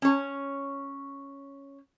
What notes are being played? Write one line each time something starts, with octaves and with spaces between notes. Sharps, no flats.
C#4 C#5